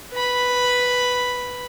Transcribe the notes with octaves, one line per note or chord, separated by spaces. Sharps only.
B4 B5